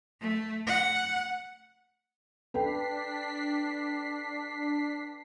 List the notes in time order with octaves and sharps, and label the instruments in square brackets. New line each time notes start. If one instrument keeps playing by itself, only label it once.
[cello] A3
F#5
[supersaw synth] D4 B6 C7 [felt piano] A4 B4 G5